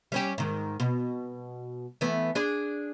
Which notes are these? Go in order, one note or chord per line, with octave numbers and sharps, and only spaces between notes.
G3 C#4 G4
G#2 D#3
B2
E3 A3 B3
D4 G#4 D5